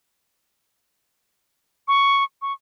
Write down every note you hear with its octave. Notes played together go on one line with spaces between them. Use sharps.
C#6
C#6